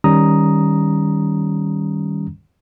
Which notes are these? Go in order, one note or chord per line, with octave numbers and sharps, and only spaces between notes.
D#3 G3 C#4 A#5 D#6